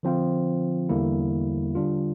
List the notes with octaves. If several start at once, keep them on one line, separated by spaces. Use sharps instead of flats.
D3 F3 C4 F4
E2 D3 G3 A#3 E4
D3 G3 D4 F4